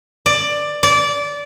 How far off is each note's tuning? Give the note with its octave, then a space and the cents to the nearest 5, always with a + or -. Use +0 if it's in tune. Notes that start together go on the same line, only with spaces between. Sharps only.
D5 +10
D5 -20